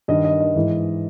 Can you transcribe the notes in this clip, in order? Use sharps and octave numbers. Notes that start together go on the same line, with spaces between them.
G2 D#3 D#5
D#5
D#5
G#2 E3